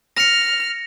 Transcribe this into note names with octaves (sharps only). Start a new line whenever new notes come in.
F6 A#6 C#7